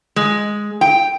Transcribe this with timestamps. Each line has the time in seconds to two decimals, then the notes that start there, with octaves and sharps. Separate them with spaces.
0.16 G#3
0.81 G5